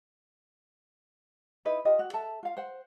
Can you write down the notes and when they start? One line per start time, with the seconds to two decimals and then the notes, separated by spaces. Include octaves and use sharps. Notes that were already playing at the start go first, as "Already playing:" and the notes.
1.65 D#4 E4 B4 D#5
1.85 F4 G4 D#5
1.99 F#4
2.13 A4 E5 A5
2.43 F4 F5
2.57 C5 F#5